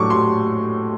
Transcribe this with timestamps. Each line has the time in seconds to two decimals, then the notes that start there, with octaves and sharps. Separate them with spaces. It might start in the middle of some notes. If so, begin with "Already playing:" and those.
Already playing: A2 F#3 A3 D4 C#6 D6
0.10 C6